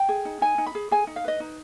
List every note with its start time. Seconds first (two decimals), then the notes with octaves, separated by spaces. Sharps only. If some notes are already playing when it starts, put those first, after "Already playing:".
Already playing: G5
0.09 G#4
0.25 D#4
0.41 D#4 G#5
0.58 D#4
0.66 B5
0.75 G#4
0.91 G#4 G#5
1.07 D#4
1.16 F5
1.24 B4 D#5
1.40 D#4